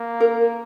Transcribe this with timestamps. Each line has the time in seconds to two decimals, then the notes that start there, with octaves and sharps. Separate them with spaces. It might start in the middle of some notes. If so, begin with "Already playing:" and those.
Already playing: A#3
0.20 A#4